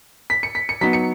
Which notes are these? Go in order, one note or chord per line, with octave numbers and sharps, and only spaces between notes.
B6
C#7
B6
C#7
F#3 B3 D#4 B6
C#7